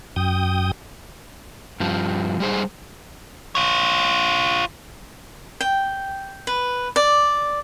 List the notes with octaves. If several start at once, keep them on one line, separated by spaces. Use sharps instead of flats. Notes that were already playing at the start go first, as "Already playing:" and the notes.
F#2 G5 D#6
G2 F3
G3 G#3 G#4 C5 D#5
F4 C#5
G5
B4
D5